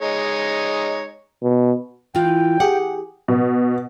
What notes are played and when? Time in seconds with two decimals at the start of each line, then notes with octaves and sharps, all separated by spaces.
0.02 G#3 D#4 C#5
1.43 B2
2.15 E3 F4 G5
2.60 G4 G#4 F#5
3.28 B2